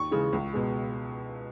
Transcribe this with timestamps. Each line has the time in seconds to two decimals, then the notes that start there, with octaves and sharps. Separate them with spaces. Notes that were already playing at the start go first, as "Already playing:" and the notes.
Already playing: D#2 C#6
0.11 C#3 E3 G#3
0.33 C#2
0.53 B2 G#3